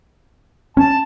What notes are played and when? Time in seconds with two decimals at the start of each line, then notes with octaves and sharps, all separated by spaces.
0.77 C#4 A5